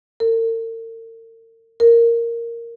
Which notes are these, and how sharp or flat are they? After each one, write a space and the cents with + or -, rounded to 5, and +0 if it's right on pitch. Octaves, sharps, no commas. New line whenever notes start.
A#4 -45
A#4 -5